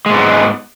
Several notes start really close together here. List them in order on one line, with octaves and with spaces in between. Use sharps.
G#3 G#2 B3